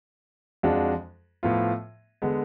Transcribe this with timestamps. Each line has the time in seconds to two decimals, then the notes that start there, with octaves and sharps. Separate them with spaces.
0.63 F2 F3 G#3 D4 F#4
1.43 A2 F3 B3 F4
2.22 D3 G#3 B3